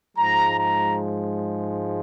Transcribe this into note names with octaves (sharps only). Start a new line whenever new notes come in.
G#2 F3 G#3 A#5
A#5